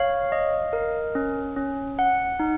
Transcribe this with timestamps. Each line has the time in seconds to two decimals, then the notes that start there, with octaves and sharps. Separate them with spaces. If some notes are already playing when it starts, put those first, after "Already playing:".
Already playing: C#5 F5
0.32 D#5
0.73 A#4
1.15 C#4
1.56 C#4
1.99 F#5
2.40 D#4